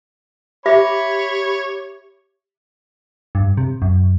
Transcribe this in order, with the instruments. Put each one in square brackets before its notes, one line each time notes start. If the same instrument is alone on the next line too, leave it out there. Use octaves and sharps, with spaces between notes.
[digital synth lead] G4 [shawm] C#5 [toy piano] E5 [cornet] B5
[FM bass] G2
C3
F#2